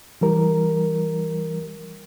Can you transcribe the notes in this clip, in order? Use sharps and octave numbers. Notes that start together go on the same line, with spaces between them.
E3 G3 A#4